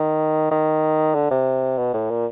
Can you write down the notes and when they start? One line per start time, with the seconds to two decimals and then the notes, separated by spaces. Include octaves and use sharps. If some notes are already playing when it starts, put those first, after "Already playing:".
Already playing: D#3
0.51 D#3
1.14 D3
1.31 C3
1.78 B2
1.94 A2
2.10 A#2